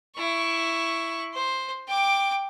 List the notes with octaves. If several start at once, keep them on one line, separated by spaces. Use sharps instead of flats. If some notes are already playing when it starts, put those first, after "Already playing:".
E4 C#6
C5
G5 D6